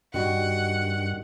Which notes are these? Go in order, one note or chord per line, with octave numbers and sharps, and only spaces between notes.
G2 D#3 G3 F#4 F#5